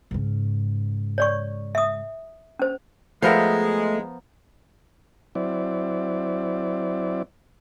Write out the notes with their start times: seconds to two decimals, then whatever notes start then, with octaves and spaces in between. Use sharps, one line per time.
0.11 G#2 C#3
1.18 C#5 D5 C#6
1.75 E5 D#6
2.59 C#4 C5
3.22 F3 G#3 A3 B3 A#4 E5 F5
5.35 F#3 C4 E4 D5